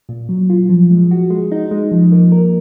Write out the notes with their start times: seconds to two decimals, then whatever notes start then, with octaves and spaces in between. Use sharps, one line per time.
0.09 A#2
0.29 F#3
0.50 F4
0.69 F3
0.91 G#3
1.11 F#4
1.30 G#3
1.52 D#4
1.71 G#3
1.92 F3
2.12 A#3
2.32 A#4